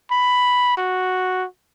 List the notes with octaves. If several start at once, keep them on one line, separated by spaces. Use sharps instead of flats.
B5
F#4